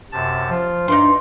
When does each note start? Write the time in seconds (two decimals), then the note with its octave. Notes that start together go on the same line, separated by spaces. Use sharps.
0.12 F#2 C3 A5
0.50 F3 F4
0.88 G2 D#4 D5 C6